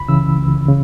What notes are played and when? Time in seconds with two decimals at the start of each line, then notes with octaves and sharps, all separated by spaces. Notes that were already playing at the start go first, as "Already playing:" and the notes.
Already playing: C#2 B5
0.08 C#3 E3 E6
0.38 C#2
0.68 C#3